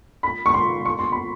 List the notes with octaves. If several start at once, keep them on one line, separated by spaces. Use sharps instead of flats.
B5
C#6
C6
C#6
C6
B5